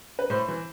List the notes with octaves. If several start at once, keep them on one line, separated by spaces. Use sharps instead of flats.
B4
A2 C5
E3